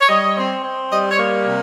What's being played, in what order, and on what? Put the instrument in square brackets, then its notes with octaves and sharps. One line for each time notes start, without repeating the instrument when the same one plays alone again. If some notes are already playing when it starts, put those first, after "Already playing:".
[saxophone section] C#5
G3 D#5
C4
C4
G3 D#5
C#5
A#3
C3